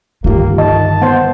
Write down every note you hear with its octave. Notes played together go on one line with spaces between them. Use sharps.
G2 D3 D#3 A#3 F4 G4
D#3 D#5 A5
B3 C5 F#5